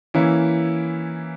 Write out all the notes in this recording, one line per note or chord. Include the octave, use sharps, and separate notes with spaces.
E3 A#3 C#4 E4